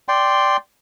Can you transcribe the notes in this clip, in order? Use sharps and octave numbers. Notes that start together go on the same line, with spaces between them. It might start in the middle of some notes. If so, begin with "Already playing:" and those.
D5 G5 C6